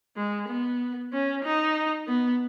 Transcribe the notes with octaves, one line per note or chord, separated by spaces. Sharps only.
G#3
B3
C#4
D#4
B3